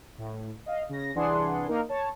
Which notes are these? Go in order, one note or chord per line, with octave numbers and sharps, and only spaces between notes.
A2
D#5 F5
C#3 A#6
C2 E3 D4 G#4 F#5 C6
A#3 D#4 A#4
C#5 A5